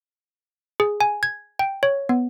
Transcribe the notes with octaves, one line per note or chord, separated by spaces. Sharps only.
G#4
G#5
G#6
G5
C#5
B3